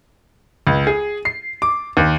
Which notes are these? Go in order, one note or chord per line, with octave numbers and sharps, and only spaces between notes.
C#2
G#4
C7
D6
D#2